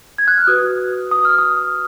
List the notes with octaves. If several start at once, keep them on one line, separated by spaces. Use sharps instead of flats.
G#6
F#6
F6
F#4 B4 D#6
D#6
F6
D#6